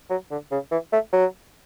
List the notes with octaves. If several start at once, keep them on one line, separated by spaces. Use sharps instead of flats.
F#3
D3
C#3
E3
A3
F#3